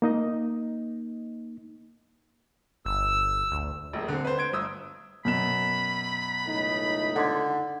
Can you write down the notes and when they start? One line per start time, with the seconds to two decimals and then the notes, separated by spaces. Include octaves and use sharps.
0.02 A#3 D#4 D#5
2.86 G1 E6
3.52 D2
3.93 D#1 A#1
4.08 D3 C4
4.25 B4 C5
4.38 C5 G#6 D7
4.53 G1 D#6 E6
5.25 F#2 B2 B5 E7
6.46 C#2 A2 D#4
7.16 D3 C6 D6 G#6